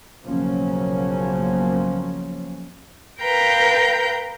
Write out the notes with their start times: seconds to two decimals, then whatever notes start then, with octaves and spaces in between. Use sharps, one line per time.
0.24 B1 C#3 F3 F#3 A#3 C#4
3.22 A#4 B4 F5 G5 A#5 G6